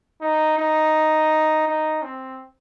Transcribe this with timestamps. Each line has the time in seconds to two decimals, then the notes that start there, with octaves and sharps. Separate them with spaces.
0.21 D#4
0.58 D#4
1.67 D#4
2.02 C4